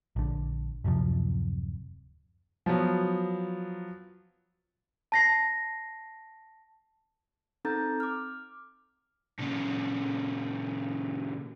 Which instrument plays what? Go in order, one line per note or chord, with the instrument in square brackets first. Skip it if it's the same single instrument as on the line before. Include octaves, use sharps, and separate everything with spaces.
[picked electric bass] A#1 D3
D1 F#2 C3 F3
[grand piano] F3 F#3 B3
[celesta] A5 A#6 C7
[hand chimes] C4 D#4 A4 A#5 G6 A6
D6 F6
[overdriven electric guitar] A#2 C#3